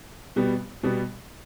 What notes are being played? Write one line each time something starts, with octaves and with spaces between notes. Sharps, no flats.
B2 G3 B3
B2 G3 B3